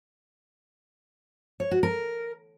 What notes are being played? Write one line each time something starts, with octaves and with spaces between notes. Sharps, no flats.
C#5
F#4
A#4